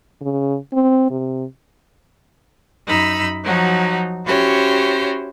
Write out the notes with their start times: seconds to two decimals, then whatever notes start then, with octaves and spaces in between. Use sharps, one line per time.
0.21 C#3
0.73 C4
1.11 C3
2.88 F#2 D#4 B5 E6
3.44 F3 F#3 D#4 F#4
4.26 C#4 E4 F#4 G4 C5 C#5